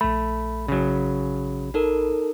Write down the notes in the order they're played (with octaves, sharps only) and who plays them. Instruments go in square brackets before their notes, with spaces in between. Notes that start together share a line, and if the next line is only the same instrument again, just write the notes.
[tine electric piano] A#1 B5 [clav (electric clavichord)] A3
[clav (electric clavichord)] C#3 F#3
[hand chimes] D#4 A4 A#4